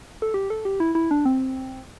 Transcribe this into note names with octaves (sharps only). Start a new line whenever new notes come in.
A4
G4
A4
G4
E4
E4
D4
C4